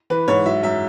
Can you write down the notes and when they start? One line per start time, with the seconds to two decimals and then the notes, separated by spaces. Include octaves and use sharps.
0.10 E3 B4
0.28 G#2 C#5
0.45 F#3 E5
0.63 F#2 E5